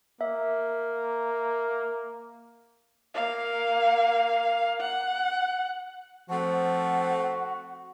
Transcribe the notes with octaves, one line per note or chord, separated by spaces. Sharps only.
A#3 E5
A#3 F5
F#5
F3 A3 C4 F#4 F#5